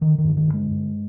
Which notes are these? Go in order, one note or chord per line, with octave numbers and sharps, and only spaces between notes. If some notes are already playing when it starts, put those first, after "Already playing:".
D3 D#3
D#3
G2
D#3
D3
G#3
G2